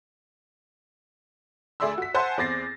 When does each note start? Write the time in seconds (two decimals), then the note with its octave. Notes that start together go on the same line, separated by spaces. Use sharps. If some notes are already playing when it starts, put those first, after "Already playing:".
1.80 D2 G#4 D5 E5 C6 E6
1.98 F#4 B6
2.14 C5 E5 F#5 G#5 A5 C6
2.37 E2 C4 D6 A6 A#6 C7